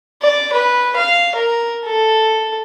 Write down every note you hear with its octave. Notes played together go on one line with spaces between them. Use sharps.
D5
B4
F5
A#4
A4